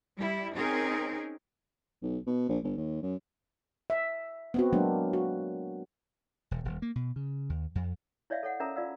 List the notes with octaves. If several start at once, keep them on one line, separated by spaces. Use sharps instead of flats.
G3 E4
C4 C#4 D#4 G#4 A#4
B1
B2
A#1
G1
D#2
F#2
E5
B3 C4 F#4
F#3 G#3 A#3 D4
F#4
E1
D#1
A#3
B2
C#3
D#2
F2
E4 C#5 D5 E5 F5
A4 C#5 F#5
C#4 A4 A#4 E5 A5 A#5
F4 D5 F5 E6